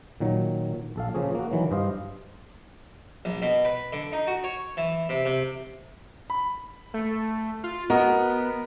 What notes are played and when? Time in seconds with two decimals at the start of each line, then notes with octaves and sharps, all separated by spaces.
0.20 A#2 D#3 F#3
0.96 A#1 A4 F5
1.14 C#3 F3 A#3 G#4 C#5
1.35 A#3 F#4
1.51 D#3 E3 F#3
1.71 G2 C5 D#5 F5
3.25 A#1
3.42 B2
3.65 B4
3.93 D3
4.13 D#4
4.27 F#4
4.44 C#5
4.77 E3
5.09 C3
5.25 C3
6.30 B5
6.94 A3
7.64 F4
7.90 B3 F#4 A#4 D#5